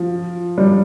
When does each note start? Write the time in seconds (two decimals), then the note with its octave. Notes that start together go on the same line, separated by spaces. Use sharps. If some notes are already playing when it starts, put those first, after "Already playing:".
Already playing: F3
0.58 G3